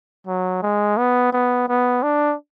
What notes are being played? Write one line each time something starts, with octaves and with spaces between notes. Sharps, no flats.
F#3
G#3
B3
B3
B3
D4